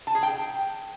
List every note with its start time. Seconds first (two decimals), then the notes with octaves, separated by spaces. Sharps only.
0.07 A5
0.15 G#4
0.23 G5